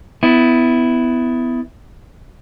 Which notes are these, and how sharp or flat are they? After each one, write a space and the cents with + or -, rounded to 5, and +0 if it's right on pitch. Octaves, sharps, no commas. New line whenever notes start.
B3 +25 E4 +0